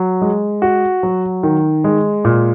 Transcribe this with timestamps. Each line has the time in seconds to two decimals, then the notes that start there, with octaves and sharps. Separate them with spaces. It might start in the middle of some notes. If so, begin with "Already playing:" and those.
Already playing: F#3
0.22 G#3
0.62 F#4
1.03 F#3
1.43 D#3
1.84 G#3
2.25 A#2